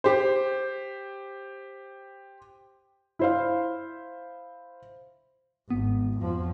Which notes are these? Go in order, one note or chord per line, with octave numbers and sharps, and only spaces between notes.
G4 C5
E4 C5 F5
G#1 B3
F2 F3